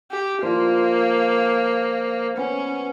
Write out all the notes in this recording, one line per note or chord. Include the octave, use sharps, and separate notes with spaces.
G4
F3 A#3 D5 C6
B3 C#4